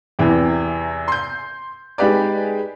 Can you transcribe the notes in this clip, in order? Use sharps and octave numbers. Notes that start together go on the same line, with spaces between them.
E2 C3 E3
C6 G6
G#3 D#4 G4 B4 D5